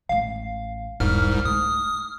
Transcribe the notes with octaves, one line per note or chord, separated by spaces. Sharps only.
A1 A3 F5
E1 C2 G#2 B3 F6
A3 D#6